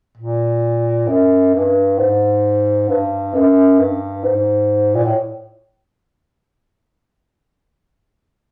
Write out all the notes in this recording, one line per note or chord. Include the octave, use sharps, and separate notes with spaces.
A#2
F#2
G2
G#2
G2
F#2
G2
G#2
A#2
A2